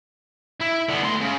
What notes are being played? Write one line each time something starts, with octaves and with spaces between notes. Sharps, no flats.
E4
D3 B3
A3 C6
C#3